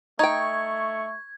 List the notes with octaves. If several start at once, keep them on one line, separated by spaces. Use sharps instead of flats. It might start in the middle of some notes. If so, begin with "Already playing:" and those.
A3 D#4 G5 C#6 G#6